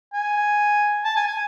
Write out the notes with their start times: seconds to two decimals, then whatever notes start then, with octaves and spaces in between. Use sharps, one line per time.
0.13 G#5
1.05 A5
1.16 G#5
1.27 G#5